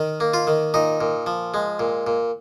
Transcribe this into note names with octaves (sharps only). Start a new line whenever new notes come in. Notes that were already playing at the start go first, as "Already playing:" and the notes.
Already playing: D#3
A#3
F4
D#3
A#2 D#4
A#2
F3
G#3
A#2
A#2